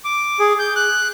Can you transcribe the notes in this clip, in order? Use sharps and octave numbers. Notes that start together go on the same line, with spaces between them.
D6
G#4
G6
F#6